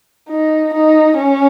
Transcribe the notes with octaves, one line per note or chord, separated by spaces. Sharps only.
D#4
D#4
C#4